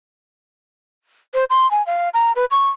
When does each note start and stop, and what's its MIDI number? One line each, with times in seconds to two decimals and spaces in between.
1.34 1.44 72
1.50 1.70 84
1.71 1.85 80
1.87 2.09 77
2.14 2.32 82
2.36 2.45 71
2.51 2.70 85